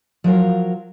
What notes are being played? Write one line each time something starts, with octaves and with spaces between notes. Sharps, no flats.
F3 F#3 A#4 F5